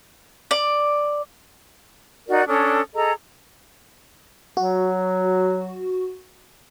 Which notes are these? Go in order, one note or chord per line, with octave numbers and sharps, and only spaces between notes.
D5
D#4 F#4 A#4 D5
C#4 D4 A4 D#6
G#4 A4 D#5 A#5
F#3 F#4